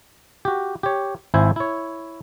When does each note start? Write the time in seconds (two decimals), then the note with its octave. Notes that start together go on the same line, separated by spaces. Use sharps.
0.45 F#4 G4
0.83 G4 C#5
1.34 G#1 E4 C5 E5 G#5
1.56 E4 C#5